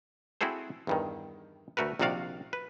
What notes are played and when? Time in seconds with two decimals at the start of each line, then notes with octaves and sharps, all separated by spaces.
0.41 C4 E4 F#4 G#4 A4 C5
0.87 E2 G2 D#3
1.77 D2 A3 F#4 A#4 B4
1.99 A#1 C3 D#3 F#4 D5 F5
2.53 B4